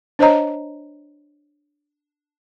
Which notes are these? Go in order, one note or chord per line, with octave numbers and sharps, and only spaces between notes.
D4 C5 C#5 D#5 A#5